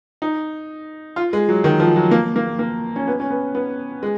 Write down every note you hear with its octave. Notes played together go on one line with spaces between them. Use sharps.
D#4
F4
G#3
F#3
D#3
F3
F#3
A#3
A#3
A#3
C#4
B3
C#4
B3
B3
G#3